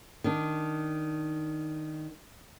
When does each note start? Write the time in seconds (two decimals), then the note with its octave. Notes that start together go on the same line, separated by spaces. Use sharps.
0.24 D#3 D4